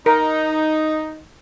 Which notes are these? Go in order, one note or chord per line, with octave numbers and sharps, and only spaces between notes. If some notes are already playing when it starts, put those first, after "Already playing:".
D#4 A#4